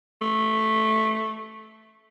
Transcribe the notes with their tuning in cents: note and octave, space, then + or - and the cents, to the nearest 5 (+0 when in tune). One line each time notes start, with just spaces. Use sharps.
A3 -5